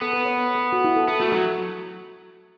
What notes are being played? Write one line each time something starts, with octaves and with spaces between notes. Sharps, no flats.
B3 A4
B4
C#5
B4
A4
F#4
E4
A4
B3 A4
A3 F#4
A4
F#3 F#4